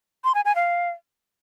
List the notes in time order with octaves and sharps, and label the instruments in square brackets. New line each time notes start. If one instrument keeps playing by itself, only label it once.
[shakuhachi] C6
G#5
G#5
F5